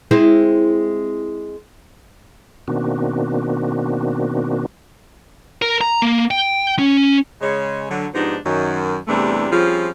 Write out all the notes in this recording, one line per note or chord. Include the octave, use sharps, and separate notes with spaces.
G#3 C4 E4
B2 D#3 A#3 C4 D4 F#4
A#4
A#5
A#3
G5
C#4
C#3 G#3 C#5
D3 F#3
G#2 F3 B3 D4 D#4 G4
F#2 D#3
E2 C3 E3 G3 A3 D4
F3 G3 C4 C#4 F4 G#4